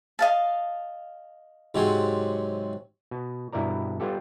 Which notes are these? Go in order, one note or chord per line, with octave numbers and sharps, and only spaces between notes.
D#5 F5 A5
G#2 C3 F#3
B2
G2 B2 E4 A#4 D5 A#5
G3 B3 F4 G4 A4